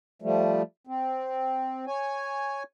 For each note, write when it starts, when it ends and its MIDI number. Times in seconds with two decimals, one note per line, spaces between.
0.22 0.62 53
0.22 0.62 55
0.22 0.62 57
0.87 1.85 60
1.87 2.63 73
1.87 2.63 80